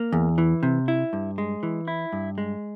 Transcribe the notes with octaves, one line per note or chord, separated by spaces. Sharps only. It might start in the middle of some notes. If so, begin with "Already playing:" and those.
Already playing: A#3
E2
E3
C3
E4
G2
G#3
E3
E4
G2
G#3